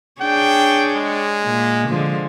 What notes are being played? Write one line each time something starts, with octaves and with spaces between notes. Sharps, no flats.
D4 G#4 C#5 G5
G#3
A#2
D3 F3 G#3